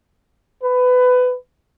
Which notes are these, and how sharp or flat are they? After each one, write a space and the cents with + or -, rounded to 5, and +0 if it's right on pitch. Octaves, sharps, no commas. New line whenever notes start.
B4 +20